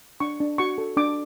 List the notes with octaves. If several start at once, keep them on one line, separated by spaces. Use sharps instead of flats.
D4 C#6
D4
F#4 C#6
A4
D4 D6